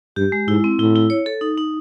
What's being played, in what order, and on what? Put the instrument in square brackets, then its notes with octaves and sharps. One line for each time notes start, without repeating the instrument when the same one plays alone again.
[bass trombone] G2 [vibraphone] G4
[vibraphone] G#3
[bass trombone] G#2 [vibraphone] E4
[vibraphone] C4
[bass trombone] A2 [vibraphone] E4
[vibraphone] E4
C#5
A4
D#4
D#4